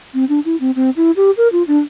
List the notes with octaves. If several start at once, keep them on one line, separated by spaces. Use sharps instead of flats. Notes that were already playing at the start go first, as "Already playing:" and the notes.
C4
D4
E4
C4
C4
E4
G4
A#4
F4
D4